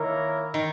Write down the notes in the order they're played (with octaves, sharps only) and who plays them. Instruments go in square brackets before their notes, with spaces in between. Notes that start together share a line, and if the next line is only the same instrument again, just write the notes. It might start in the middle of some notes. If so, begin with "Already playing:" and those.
Already playing: [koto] D#3 [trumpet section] A#3 E4 A#4 C#5
[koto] D#3